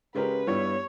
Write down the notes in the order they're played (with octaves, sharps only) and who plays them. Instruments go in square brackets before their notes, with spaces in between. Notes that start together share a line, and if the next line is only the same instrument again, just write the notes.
[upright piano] C#3 G#3 C#4 G4 A#4 [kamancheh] B4
[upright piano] G2 G3 B3 E4 [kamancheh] C#5